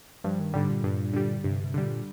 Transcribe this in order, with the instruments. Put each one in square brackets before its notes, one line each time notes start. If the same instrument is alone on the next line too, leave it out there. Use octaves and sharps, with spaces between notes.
[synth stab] G2 [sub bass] F3
[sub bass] D#3
[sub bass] G#2 [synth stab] D3 G3
[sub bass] A#2
[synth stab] G2
D3 G3
[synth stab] G2 [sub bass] C3
[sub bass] C3
[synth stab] D3 G3
[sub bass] A#2